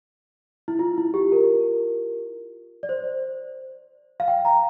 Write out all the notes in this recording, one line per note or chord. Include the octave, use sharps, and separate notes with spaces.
E4
F4
E4
G4
A#4
D5
C5
F5
G5
A#5